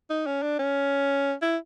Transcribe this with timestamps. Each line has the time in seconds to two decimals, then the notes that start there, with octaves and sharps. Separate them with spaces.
0.10 D#4
0.26 C#4
0.43 D4
0.59 C#4
1.42 E4